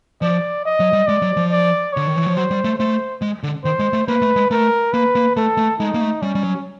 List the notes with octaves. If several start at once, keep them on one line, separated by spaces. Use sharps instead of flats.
F3 D5
D#5
F#3
G3
G#3 D5
F#3
F3
D5
D3 C#5
D#3
E3
F3
F#3 C5
G3
A3
A3 C5
G#3
D3
D#3 C5
G#3
A3
A#3 B4
A3
G#3
A3 A#4
A#3 B4
A#3
A3 A4
A3
G#3 D#4
A#3
A3
G3 C#4
G3
F#3